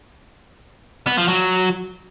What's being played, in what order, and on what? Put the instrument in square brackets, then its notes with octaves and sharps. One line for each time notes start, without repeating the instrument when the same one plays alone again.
[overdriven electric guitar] B3
F3
F#3